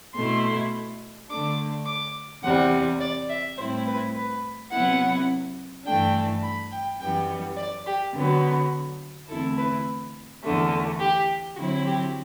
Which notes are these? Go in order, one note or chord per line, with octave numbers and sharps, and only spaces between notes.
B2 A3 E4 C6
D3 A3 D4 D6
D6
E2 C3 G3 F#5
D5
E5
A2 G3 C4 E4 C5
B4
B4
C3 F#3 B3 E4 F#5
G2 E3 A3 D4 G5
B5
G5
F#2 E3 G3 B3 G5
D5
G4
D3 F#3 B3
E2 D3 A3 C4 E4 A4
B4
E2 D3 A3
G4
D3 F#3 C4 E4 F#4
G4